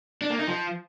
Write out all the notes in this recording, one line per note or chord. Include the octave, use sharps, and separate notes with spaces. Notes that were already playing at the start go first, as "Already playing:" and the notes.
D4
A#3
D#4
F3